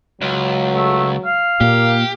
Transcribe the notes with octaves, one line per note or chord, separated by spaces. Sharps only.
C#2 F#3
A3
F5
A#2 A#3 G4